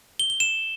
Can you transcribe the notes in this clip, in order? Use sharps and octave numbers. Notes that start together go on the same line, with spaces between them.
G7
G7
E7